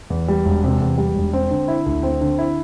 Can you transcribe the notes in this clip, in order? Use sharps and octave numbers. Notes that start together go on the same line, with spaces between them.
E2
G3
E1
C3
E2
G3
E1
C4
D3
E4
D2
C4
D3
E4